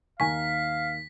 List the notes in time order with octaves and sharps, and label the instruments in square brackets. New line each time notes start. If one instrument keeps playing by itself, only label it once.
[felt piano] D#2 D#3 A#5 [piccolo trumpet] F5 [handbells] G#5 C#6 [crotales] B6